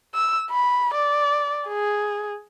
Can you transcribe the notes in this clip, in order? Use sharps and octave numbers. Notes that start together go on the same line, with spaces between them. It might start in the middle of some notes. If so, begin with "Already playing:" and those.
E6
B5
D5
G#4